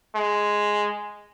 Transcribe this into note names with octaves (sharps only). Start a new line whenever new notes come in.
G#3